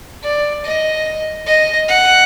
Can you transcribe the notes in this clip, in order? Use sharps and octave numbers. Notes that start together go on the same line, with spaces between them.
D5
D#5
D#5
F#5